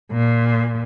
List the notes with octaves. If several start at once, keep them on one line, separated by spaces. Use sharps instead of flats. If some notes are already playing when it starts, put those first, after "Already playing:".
A#2